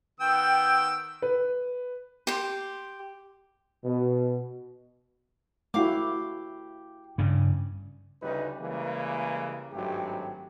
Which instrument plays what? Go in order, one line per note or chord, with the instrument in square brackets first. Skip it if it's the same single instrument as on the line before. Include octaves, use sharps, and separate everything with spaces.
[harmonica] D#3 B3 E6 [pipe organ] G5
[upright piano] B4
[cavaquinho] G4 C6
[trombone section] B2
[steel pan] A3 E4 F#4 [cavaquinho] G4 F5 D6
[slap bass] G2 C#3
[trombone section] D2 C#3 G3 D#4 B4
C#3 E3 G3 G#3 A#3
G#1 G2 F#3 A3 G4